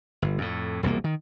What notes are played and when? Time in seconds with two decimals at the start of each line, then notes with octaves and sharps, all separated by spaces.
0.22 G1
0.38 F2 A2
0.83 E1 C2 F2 A#3
1.04 D#3